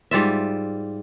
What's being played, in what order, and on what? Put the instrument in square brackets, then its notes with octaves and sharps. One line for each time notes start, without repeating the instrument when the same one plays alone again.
[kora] G#2 G3 F4 E5